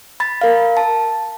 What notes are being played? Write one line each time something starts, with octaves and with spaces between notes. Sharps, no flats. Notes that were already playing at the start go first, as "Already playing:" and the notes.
B5 A6
A#4 F5
A5